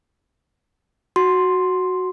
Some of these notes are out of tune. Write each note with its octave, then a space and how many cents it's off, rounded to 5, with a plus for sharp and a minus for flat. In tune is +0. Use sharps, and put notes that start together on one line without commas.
F#4 +0 C6 +0